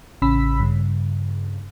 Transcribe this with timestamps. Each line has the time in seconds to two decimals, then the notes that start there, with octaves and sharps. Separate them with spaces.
0.22 A1 C#3 C#4 B5 E6 B6
0.60 G2 C#3